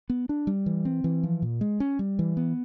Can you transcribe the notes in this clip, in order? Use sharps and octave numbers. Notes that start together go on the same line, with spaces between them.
B3
D4
G3
E3
C4
E3
F3
A#2
G#3
C#4
G3
E3
B3